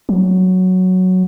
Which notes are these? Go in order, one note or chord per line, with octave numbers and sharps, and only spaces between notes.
F#3